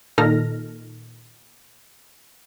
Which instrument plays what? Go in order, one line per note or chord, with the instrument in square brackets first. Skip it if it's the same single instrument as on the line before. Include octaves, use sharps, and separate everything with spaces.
[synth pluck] A#2 D#3 D#4 A4 F6 A#6